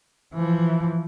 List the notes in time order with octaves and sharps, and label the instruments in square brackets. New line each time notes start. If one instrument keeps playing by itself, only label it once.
[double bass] E3 F3